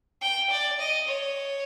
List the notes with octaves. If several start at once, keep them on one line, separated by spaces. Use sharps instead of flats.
G5
D5
D#5
C#5